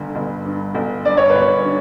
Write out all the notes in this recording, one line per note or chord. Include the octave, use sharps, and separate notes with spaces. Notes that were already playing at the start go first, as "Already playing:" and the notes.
Already playing: G1 G2 D3
G1
G2
G1
G2 D5
C#5
G1 B4
C#5
D3